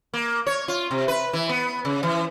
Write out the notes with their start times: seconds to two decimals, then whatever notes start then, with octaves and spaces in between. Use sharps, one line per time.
0.14 A#3
0.47 C#5
0.68 F4
0.91 C3
1.08 B4
1.33 E3
1.49 B3
1.85 C#3
2.03 E3